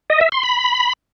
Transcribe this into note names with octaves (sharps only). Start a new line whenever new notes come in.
D#5
E5
C6
B5